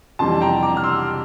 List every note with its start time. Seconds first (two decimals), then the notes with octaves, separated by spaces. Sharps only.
0.19 F2 C3 E3 G3 A5 C6
0.41 G5 A#5
0.63 A#5 D6
0.77 F6
0.84 C6 E6